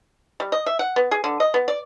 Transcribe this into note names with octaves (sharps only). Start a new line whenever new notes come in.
G3
D#5
E5
F#5
B3
G#4
D3
D#5
B3
D5